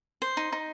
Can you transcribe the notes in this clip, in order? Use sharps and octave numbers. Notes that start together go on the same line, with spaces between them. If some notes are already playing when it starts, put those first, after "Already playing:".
C5
D#4
D#4